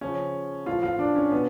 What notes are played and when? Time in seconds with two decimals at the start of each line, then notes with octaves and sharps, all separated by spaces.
0.01 C#3 F3 C#4
0.66 A2 F3 F4
0.83 F4
0.99 D4
1.16 C#4
1.32 B2 B3